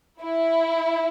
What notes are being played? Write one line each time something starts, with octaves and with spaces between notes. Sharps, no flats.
E4